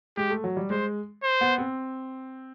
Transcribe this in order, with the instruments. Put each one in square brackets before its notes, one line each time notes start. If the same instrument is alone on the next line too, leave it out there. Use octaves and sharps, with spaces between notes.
[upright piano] G#3 [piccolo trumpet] G4
[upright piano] A3
F#3
G3
[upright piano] G#3 [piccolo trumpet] C5
[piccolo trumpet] C5
[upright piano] B3
C4